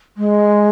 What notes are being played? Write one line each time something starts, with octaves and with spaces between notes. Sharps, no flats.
G#3